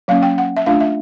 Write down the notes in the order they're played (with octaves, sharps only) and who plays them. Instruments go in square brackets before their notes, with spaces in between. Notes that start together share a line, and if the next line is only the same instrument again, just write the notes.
[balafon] F#3 A#3 C#4 F5
G5
F#5
E5
A3 D4 F4 F5
E5